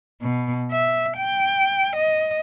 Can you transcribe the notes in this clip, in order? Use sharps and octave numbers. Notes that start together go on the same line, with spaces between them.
B2
E5
G5
D#5